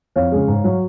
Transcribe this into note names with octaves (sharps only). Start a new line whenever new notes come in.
F2 C#5 F5
C#3 G#3
G#2
F#3